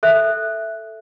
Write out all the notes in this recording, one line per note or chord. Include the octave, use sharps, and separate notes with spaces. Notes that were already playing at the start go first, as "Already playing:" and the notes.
A4 E5 F#6